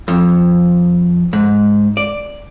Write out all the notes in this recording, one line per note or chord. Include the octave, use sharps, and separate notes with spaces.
F2
G#2
D5